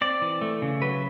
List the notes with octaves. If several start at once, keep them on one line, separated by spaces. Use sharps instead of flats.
C4 D5
E3
A3
C#3
F#3 B4